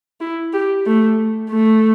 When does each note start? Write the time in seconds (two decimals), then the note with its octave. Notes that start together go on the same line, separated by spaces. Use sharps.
0.20 E4
0.53 G4
0.86 A3
1.50 A3